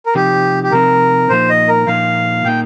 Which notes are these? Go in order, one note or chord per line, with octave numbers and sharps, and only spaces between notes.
A#4
C3 F3 C4 D#4 G4
G4
C3 F3 C4 D#4 A#4
A#2 F3 A#3 D#4 C5
D#5
A#4
A#2 F3 A#3 D#4 F5
A#2 A#3 D#4 G5